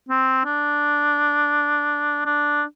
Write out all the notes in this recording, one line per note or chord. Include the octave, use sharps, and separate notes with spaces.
C4
D4
D4